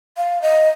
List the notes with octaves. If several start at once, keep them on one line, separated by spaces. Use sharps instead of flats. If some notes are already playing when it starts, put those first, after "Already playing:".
F5
D#5